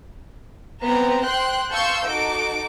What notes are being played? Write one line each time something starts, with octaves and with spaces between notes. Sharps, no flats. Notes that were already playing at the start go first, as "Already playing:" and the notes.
B3 C4 B4 A#5
C5 G5 C6 F#6
F5 A5 C6 C#6 E6 G6
D#4 F#4 A4 D6